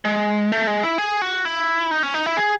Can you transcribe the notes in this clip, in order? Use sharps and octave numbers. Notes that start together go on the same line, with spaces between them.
G#3
A3
G#3
E4
G#4
F#4
E4
D#4
C#4
D#4
E4
G#4